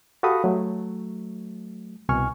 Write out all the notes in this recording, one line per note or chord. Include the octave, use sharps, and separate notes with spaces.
F#4 G4 A4 F5 B5 D#6
F#3 A3
C2 B2 G#5 C#6 F6